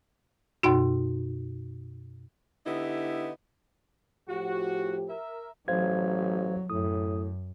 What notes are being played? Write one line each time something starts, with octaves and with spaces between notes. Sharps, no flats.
F#2 B2 D#4 F#4
D3 B3 D#4 E4 G4
A2 F3 F#4 G4
A#4 E5
A1 F#3 C5 F5 G#6
F#2 A2 D#6